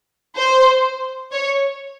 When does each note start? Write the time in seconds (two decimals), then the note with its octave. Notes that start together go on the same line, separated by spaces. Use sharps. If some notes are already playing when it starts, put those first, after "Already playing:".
0.36 C5
1.32 C#5